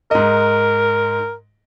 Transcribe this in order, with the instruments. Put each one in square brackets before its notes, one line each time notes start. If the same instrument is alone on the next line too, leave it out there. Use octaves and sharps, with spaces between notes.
[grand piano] G#2 D#5 [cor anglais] A#4